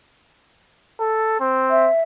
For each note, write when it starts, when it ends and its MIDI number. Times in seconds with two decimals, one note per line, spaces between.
1.00 1.36 69
1.40 1.88 60
1.71 2.02 76